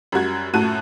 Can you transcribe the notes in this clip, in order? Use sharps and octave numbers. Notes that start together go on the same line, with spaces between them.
F#2 G3 F#4 G#6
F#2 A2 F#4 A5 F#6 D#7